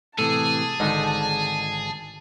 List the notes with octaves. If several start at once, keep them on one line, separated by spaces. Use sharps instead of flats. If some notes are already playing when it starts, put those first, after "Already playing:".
A2 C3 E3 G#4 A4 A5
G#1 G#2 D3 D#4 D#5